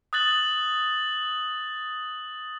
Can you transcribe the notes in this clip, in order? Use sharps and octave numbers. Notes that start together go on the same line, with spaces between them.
D#6 F#6 A6 F#7